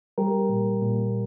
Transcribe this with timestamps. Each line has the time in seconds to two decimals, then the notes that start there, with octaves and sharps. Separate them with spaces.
0.18 G3 G4 A#4
0.49 A#2
0.82 A#2